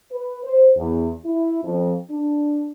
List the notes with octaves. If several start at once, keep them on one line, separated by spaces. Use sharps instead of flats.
B4
C5
E2
E4
F2
D4